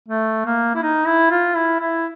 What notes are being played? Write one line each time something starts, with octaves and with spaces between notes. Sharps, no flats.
A3
A#3
E4
D#4
E4
F4
E4
E4